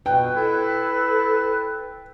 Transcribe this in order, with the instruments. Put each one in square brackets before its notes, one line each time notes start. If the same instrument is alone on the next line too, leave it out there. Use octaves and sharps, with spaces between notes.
[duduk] B2 [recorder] B4 [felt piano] G5
[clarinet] E4 [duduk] A4